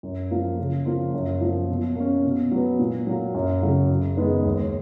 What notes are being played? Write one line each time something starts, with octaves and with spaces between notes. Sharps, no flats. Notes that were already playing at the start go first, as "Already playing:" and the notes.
F#2
F3 A#3
C#3
F3 A#3 F4
F#2
F3 A#3
B2
A#3 C#4
B2
F#3 B3
A#2
F#3 A#3
F#2
C#3 F#3
F#2
D#3 G#3 B3
D#2